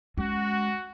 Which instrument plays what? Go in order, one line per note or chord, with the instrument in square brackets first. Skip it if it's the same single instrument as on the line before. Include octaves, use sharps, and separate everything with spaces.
[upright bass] G#3 C#4 [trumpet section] F#4